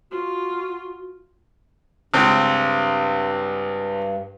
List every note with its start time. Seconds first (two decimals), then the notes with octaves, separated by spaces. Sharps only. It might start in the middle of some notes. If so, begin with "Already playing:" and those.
0.11 F4 F#4
2.14 C#2 G2 C4